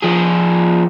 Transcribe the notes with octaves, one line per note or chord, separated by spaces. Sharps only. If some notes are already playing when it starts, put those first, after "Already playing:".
F3 G#4